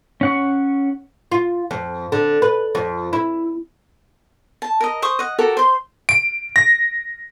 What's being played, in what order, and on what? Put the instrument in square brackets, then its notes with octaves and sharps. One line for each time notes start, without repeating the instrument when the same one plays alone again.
[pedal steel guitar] C#4 F#5 C#6
[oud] F4
F2
D3
B4
F2
E4
[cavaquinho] A5
A#4 D#5
C5 C#6 D#6
D#5 F#5
F#4 G4 A4 A#4
C5 C6
[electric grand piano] D7
A#6